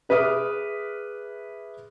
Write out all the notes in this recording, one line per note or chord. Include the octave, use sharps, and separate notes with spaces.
G#4 B4 E5 D6 D#6 F6